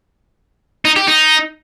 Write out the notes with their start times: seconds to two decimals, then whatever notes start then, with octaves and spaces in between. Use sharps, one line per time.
0.85 D#4
0.96 G4
1.08 D#4